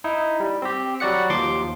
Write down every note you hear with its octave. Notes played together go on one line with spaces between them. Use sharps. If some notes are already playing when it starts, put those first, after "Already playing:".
D#4 E4
G3
C4 G4
F#3 G3 F#4 D5 F#5 C#7
D#2 F3 C6 D6